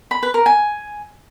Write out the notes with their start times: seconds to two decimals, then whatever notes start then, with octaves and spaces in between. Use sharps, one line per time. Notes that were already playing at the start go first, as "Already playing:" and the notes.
0.11 B5
0.23 B4
0.34 A#4
0.46 G#5